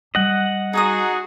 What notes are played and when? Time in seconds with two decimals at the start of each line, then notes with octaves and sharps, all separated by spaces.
0.15 G3 D#5 F#5
0.73 D#4 F#4 G#4 A#5 D#6